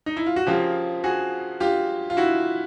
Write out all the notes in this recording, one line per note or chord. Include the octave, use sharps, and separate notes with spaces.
D#4
E4
F4
F#4
C#3 F3 A#3 F4 G4
F#4 G#4
F4 G4
F4
E4 F#4